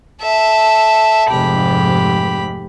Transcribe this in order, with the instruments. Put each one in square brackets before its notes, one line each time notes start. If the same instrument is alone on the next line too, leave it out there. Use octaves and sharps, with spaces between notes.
[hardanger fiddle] A4 E5
[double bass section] F1 G#2 [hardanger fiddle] G4 B5